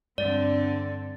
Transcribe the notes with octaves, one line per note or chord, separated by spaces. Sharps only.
G2 D3 C4 D5 A6